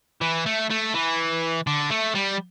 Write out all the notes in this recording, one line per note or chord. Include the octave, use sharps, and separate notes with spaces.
E3
A3
A3
E3
D3
A3
G3